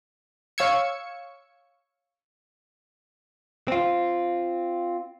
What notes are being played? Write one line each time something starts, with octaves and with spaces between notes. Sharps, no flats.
C#5 F5 C#6 E6 G#6 C#7
C4 F4